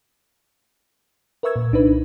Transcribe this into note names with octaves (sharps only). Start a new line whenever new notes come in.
A#4 B4 E5 C#6 E6 G#6
A#2
C2 D4 D#4 B4